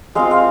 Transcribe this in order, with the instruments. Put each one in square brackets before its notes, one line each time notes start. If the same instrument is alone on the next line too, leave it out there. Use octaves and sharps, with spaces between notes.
[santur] G#3 C4 F4 F5
F5